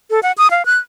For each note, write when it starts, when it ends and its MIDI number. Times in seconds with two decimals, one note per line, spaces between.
0.10 0.20 69
0.23 0.32 78
0.38 0.50 87
0.51 0.65 77
0.66 0.78 90